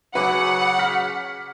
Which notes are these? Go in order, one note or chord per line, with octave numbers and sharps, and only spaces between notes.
C#3 F#3 B4 F#5 D6
F6 B6